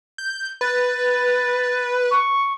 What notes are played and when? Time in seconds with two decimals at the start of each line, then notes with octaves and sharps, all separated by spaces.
0.18 G6
0.61 B4 A6
2.10 C#6